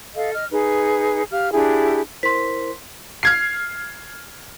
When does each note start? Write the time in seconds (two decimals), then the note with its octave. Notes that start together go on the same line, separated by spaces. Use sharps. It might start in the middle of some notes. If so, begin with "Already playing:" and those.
0.15 A4 D#5 F5
0.33 D#5 F6
0.51 D#4 G#4 B4
1.31 G4 F5 F6
1.52 D4 E4 G4 G#4
2.23 E4 A#4 C5 C6 B6
3.23 F6 G#6 C7